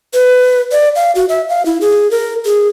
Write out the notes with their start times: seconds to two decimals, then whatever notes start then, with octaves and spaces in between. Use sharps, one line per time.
0.14 B4
0.72 D5
0.96 F5
1.15 F#4
1.29 E5
1.49 F5
1.66 E4
1.81 G#4
2.11 A#4
2.45 G#4